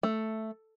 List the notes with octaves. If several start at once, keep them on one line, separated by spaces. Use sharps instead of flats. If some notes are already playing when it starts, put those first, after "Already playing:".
A3